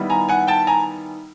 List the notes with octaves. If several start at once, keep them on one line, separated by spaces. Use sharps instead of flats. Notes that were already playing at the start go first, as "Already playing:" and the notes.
Already playing: D#3 G3 B3 E4
G#5 A#5
F#5 G#5
G5 A5
G#5 A#5